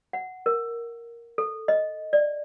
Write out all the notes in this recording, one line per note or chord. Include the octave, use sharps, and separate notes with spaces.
F#5
A#4
A4
D#5
D5